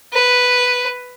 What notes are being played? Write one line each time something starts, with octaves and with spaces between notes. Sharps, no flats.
B4